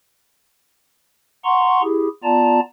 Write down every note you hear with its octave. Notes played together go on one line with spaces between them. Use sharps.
F#5 A#5 C6 C#6
E4 G4 G#4
B3 F4 D5 A5 A#5